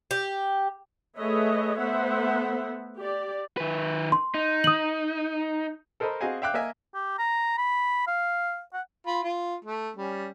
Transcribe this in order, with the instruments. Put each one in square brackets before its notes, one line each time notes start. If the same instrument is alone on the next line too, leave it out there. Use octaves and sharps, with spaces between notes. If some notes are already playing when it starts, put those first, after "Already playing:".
[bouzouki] G4
[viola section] A3 G#4 B4 C#5 D#5 E5
A3 B3 C5 E5 F#5
G4 D5
[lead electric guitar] D#3 B4
[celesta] C6
[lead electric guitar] D#4
[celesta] D#6 F#7
[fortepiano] A4 A#4 C5 D#5 B5
C4 F#4 G#4 D#5 F5 G#5
E5 F5 G5 D6 F#6
A#3 A#4 D#5 E5 G#5
[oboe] G4
A#5
B5
F5
F#5
[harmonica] F4 B5
F4
A3
G3 C#4